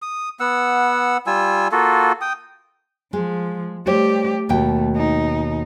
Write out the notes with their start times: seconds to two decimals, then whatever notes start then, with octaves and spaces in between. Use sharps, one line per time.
0.02 D#6
0.40 B3 F#5 E6
1.27 G3 F4 G#5 E6
1.72 A#3 F4 F#4 A4
2.21 G5 D#6
3.13 F3 G#3
3.87 G3 A3 G4 C5 C#5
4.49 D#2 B2 A3 G5
4.97 D#4